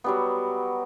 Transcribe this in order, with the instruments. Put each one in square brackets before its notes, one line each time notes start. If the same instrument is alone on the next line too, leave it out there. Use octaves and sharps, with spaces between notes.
[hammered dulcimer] F#3 G3 B3